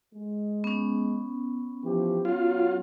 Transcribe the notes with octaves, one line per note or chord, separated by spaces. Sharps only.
G#3
B3 C#4
E3 F3 G4
F#3 F4